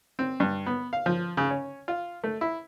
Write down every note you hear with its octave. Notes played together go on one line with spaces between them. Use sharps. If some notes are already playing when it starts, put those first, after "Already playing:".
C4
G2
B3
F5
F3
C#3
C#4
F4
A3
E4